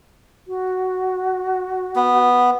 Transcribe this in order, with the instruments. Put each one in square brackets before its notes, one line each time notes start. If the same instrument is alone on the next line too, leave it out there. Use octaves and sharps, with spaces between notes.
[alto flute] F#4
[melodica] B3